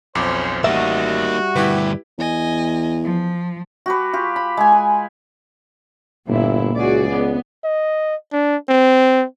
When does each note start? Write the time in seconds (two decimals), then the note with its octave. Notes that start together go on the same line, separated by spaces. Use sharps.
0.15 B1 F2 C#4 C5 D6
0.64 A1 G3 A#3 D#4 F#4 E5
1.56 D2 G2 E4 G4 B4
2.18 E2 D#5 G#5
3.03 F3
3.86 F#4 G4 B4
4.13 F4 G4
4.36 B5
4.57 G#3 G#5
4.72 B4
6.28 G1 A#2 E4
6.76 C#2 F#4 G#4 D5
7.09 B3
7.64 D#5
8.33 D4
8.69 C4